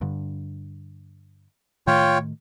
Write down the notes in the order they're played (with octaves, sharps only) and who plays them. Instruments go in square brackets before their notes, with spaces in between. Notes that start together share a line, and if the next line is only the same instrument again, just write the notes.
[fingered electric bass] G2 D3
[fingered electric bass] A2 D#3 A3 [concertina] F4 C#5 G5